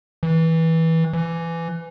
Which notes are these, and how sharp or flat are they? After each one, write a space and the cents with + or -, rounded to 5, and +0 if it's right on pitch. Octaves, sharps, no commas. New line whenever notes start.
E3 -20
E3 +20